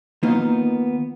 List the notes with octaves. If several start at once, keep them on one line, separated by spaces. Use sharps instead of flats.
D#3 A#3 B3 D#4 F4